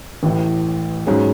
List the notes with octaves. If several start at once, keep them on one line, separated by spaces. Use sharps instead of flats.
A1 A2 E3
G#2 F#3 C#4 G#4